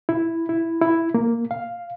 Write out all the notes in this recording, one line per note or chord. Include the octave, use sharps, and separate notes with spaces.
E4
E4
E4
A#3
F5